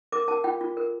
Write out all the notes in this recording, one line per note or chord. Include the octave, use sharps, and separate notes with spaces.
A#4 D6
A#4 A5
F4 G5
F4
A#4